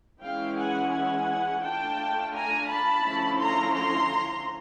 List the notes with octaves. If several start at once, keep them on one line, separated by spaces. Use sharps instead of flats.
E3 G#3 C#4 E4 F5 G5
F#5 G#5
F#5 G#5
A3 D4 F4 G5 A5
G#5 A#5
A5 B5
D3 F3 A3 C#4 E4
A#5 C6
A#5 C6